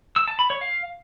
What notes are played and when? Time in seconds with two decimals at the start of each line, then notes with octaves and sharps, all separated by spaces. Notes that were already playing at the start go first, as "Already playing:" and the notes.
0.16 E6
0.28 A5
0.39 B5
0.50 C#5
0.61 F5